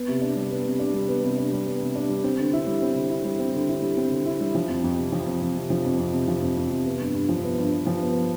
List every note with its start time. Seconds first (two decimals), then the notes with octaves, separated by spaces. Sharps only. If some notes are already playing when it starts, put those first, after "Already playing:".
Already playing: B3
0.08 C3
0.21 D4
0.36 G3
0.51 B3
0.66 C3
0.79 D4
0.94 G3
1.08 B3
1.23 C3
1.38 D4
1.52 G3
1.66 B3
1.81 C3
1.95 D4
2.09 G3
2.24 C4
2.39 D3
2.53 E4
2.67 G3
2.82 C4
2.96 D3
3.10 E4
3.25 G3
3.39 C4
3.54 D3
3.69 E4
3.82 G3
3.97 C4
4.12 D3
4.26 E4
4.41 G3
4.55 F3
4.69 F2
4.84 F2
4.98 C3
5.12 F3
5.26 F2
5.42 F2
5.55 C3
5.70 F3
5.84 F2
5.99 F2
6.13 C3
6.28 F3
6.42 F2
6.57 F2
6.71 C3
6.86 B3
7.00 G2
7.14 G2
7.29 F3
7.43 B3
7.58 G2
7.73 G2
7.87 F3
8.01 B3